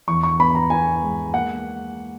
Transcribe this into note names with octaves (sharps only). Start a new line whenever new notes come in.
E2 C#6
C#6
B3 B5
A#5
B3 G#5
G#3
A#3 F#5